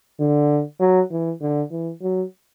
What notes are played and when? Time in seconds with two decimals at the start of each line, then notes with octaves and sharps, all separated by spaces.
0.20 D3
0.80 F#3
1.11 E3
1.41 D3
1.71 E3
2.02 F#3